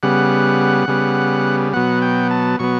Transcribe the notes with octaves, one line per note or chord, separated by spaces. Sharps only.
C#3 G3 B3 F#5
C#3 G3 B3
B2 F#3 B3 F#5
G5
A5
B2 F#3 B3 C#6